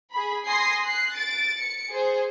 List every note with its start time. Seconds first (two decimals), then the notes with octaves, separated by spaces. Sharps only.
0.12 G#4 B5
0.47 G#5 C6 D#6 A#6 C7
0.85 F#6 C7
1.16 A6 D7
1.58 C#7
1.90 G#4 C5